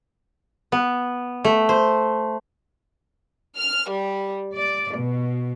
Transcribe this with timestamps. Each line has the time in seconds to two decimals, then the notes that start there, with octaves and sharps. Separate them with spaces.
0.72 B3
1.44 A3
1.69 C5
3.57 F6
3.90 G3
4.55 D5
4.96 B2